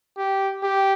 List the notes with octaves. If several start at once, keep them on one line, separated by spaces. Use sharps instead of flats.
G4
G4